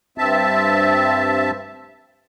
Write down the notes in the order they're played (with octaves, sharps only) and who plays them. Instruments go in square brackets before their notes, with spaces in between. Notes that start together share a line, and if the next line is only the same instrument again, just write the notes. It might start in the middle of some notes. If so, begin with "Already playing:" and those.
[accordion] G2 C4 E5 A5